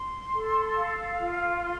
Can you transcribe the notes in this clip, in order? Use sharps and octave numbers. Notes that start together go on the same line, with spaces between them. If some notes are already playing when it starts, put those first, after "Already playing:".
Already playing: C6
A4
F5
F4
C6